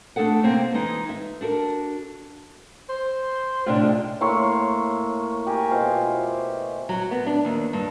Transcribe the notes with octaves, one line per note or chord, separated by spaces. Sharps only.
A3 D4 G#4 A4 F#5
C3 A#3 C4
E3 G#3 D#4
E5
D4 F#4 A4 A#4
C5
A2 C3 D4 F4
G#3
A2 A#3 C#5 C6
G4 A#4 G#5
B2 F4 C5
E4
F#3
B3
D4
D#2
G2